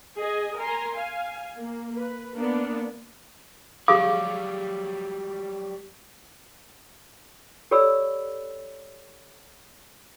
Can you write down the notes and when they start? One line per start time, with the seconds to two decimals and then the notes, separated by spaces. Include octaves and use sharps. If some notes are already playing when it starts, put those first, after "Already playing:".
0.21 G#4 D#5 G#5
0.59 A#4 G#5 A#5 C6
0.96 F5 G#5
1.58 A#3
1.96 B4
2.38 A#3 B3 D4
3.88 F#3 G3 G4 G#4 F5 D6
7.71 G4 A4 C#5 D5 B5 E6